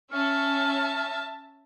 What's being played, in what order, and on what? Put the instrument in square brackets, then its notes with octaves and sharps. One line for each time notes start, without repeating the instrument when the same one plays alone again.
[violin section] C#4 [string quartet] E5 A5 [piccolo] F6